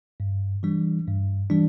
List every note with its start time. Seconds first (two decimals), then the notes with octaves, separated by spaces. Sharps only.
0.20 G2
0.63 E3 G3 D4
1.07 G2
1.50 E3 G3 D4